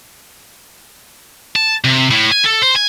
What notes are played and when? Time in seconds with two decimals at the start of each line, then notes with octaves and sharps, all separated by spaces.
1.56 A5
1.84 C3
2.11 A2
2.31 G#5
2.45 A4
2.62 C5
2.75 G#5